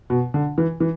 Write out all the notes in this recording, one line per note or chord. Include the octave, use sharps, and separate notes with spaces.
B2
D3
E3
E3